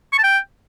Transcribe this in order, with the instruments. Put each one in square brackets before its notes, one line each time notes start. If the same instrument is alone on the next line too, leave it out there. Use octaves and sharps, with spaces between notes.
[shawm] C#6
A5
G5